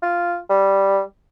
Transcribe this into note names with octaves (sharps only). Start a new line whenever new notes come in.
F4
G3